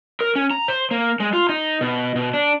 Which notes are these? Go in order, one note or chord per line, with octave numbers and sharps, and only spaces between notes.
A#4
C#4
A#5
C5
A#3
G#3
F4
D#4
B2
B2
D4